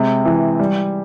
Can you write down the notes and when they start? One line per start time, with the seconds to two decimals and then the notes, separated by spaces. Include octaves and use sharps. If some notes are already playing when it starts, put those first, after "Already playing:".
Already playing: C3 G#3
0.25 E3
0.59 G3